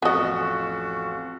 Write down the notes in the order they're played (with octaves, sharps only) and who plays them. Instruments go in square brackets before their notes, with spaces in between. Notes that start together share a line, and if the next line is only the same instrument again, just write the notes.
[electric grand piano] A1 F#4 [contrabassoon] F2 [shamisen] B3 D#5